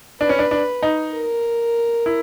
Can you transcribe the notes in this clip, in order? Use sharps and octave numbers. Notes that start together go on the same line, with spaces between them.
D4 B4
C#4
D4
D4
D#4
A#4
E4